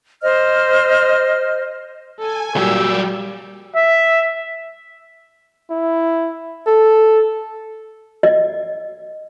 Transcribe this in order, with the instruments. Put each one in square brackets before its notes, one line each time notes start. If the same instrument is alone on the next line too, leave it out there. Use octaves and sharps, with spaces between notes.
[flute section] C5 D#5 F6
[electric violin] A4 [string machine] G#5
[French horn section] A#2 F#4 [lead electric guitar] F#3 G4 [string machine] G3 [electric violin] E6
[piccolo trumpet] E5
[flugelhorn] E4
A4
[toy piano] D#5